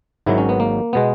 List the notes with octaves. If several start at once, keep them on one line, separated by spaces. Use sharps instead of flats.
G#1 G#2 D#3 F#3 E4
C#4
B3
A#3
B2 G#3 B3